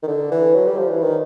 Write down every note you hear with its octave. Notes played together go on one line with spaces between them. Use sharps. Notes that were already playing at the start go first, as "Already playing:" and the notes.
D#3
D3
E3
F#3
G3
F3
E3
D#3